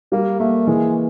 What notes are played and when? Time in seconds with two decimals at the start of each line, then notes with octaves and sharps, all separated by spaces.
0.12 G3 A#3
0.40 A3 A#3
0.67 E3 G#3